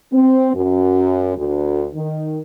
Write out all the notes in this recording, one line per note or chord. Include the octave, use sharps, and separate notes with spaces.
C4
F#2
D2
D#3